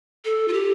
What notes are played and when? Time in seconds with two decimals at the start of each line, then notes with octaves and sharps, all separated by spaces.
0.25 A4
0.48 F4
0.53 G4